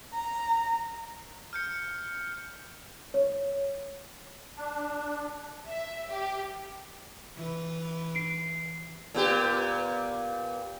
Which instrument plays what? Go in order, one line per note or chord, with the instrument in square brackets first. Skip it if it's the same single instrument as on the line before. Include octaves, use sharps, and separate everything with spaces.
[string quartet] A#5
[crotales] F6 G6 C#7
[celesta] C#5
[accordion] D4
[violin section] E5
G4
[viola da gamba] E3 B4
[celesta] C7 D7
[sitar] A#2 B3 G4